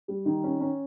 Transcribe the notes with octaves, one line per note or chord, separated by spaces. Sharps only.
G3
D#3
C#4
C#4